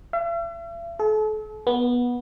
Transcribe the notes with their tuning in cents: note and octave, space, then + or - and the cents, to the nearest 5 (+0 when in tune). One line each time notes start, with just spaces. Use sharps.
E5 +45
A4 -40
B3 -15